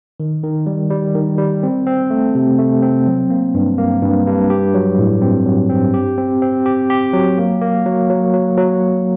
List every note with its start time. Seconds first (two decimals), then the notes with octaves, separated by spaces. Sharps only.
0.20 D#3
0.43 D#3
0.66 G3
0.91 G3
1.15 D#3
1.38 G3
1.63 C4
1.87 C4
2.10 A3
2.35 C3
2.59 A3
2.82 C4
3.07 F#3
3.30 A#3
3.55 G2
3.78 A#3
4.02 G2
4.27 G2
4.50 G4
4.74 F#3
4.98 A2
5.22 C4
5.46 F#3
5.69 C4
5.94 G4
6.18 C4
6.42 C4
6.66 G4
6.90 G4
7.13 F#3
7.38 A#3
7.61 A#3
7.86 F#3
8.10 F#3
8.33 F#3
8.58 F#3